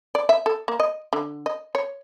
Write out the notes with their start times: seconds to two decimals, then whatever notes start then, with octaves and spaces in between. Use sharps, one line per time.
0.15 D5
0.29 E5
0.46 A4
0.68 A#3
0.80 D#5
1.13 D3
1.46 D#5
1.75 C#5